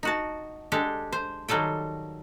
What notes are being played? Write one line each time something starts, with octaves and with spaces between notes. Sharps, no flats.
D#4 F#4 A5
G#3 D4 G4 A4
C5
D#3 F#3 G3 A4 G5